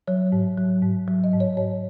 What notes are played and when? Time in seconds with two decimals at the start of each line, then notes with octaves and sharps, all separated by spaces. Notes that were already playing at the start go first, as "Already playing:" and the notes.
0.07 F#3 C#5
0.32 G#2
0.58 F#3
0.83 G#2
1.08 F#3
1.24 D#5
1.33 G#2
1.40 C#5
1.57 G#2 C#5